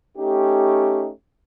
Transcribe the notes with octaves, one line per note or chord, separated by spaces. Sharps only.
A3 C#4 D#4 G4